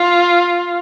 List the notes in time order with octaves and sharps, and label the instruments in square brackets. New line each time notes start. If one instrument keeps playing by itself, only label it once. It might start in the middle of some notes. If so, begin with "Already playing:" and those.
Already playing: [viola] F4